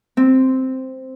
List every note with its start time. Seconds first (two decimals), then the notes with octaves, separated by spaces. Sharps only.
0.17 C4